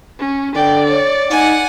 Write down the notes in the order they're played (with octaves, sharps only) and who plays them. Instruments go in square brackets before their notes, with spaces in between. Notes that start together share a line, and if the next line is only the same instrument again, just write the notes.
[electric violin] C#4
[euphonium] D3 [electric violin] D5 [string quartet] G5
[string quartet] C#5
[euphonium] D#4 [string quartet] F#5 G#5